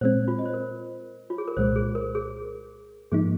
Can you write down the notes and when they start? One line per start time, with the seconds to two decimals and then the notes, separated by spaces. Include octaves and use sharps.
0.01 A#2 G#3 C4 C5
0.28 F4
0.39 D#5
0.45 C5
0.54 A#4
1.30 F4
1.38 G#4
1.48 A#4
1.57 C2 A#2 G#3 C5
1.76 G#4
1.95 A#4
2.15 G#4
3.12 G#2 F3 A#3 D#4 G#4